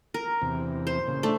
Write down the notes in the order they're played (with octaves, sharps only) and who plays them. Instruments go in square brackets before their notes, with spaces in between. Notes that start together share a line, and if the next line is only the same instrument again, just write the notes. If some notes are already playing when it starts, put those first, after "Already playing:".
[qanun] A#4
[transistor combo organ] E2 C3
[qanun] C5
[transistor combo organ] A#2 C#3
[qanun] A3 [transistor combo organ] D4